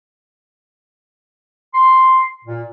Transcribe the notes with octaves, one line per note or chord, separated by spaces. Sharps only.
C6
A#2